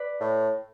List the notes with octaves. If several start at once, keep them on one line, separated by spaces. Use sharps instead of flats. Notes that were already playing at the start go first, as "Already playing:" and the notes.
Already playing: B4 D5
A2